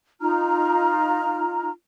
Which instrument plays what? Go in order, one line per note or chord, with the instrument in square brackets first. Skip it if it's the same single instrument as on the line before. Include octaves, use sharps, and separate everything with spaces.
[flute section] D#4 F4 A#5 F6